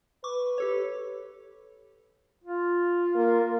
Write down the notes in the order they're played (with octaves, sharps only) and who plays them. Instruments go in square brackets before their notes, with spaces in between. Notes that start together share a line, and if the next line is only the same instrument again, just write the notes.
[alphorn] B4 [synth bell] C#6 D6
[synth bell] G4 A4 C#5
[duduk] F4
[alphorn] A#3